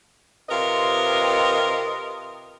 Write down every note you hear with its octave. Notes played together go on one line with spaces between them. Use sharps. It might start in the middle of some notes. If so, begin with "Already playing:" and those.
C3 F4 A#4 B4 D#5